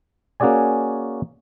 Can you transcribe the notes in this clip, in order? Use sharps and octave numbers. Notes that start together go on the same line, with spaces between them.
A#3 C#4 F#4 G#4 D5 G#5